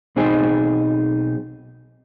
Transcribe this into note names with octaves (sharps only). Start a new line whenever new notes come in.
B1 C4 D#4 G#4